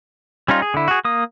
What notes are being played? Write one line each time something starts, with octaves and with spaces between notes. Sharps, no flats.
G3 C#4 D#4 F4
G#4
D3 E4
F#4 G#4
A#3 D#6